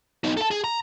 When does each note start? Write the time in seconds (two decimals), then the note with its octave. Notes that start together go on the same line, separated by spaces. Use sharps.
0.24 B3 D#4
0.37 A4 A5
0.51 G#4
0.64 A#5